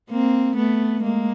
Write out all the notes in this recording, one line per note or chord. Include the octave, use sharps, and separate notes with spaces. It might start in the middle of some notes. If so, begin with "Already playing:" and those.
A#3 C4
A3 B3
G#3 A#3